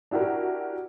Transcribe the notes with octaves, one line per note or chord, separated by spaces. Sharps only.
D4 E4 F#4 G4 A#4